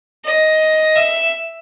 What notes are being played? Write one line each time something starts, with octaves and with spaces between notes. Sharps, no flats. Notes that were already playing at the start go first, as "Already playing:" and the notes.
D#5
E5